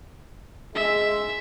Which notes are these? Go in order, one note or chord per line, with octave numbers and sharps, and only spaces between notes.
G#3 E5